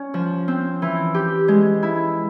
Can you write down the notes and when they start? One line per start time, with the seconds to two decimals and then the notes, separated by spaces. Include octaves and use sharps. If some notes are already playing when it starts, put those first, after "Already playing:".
Already playing: C#4
0.14 F3
0.48 C4
0.82 E3
1.14 G4
1.48 G#3
1.83 E4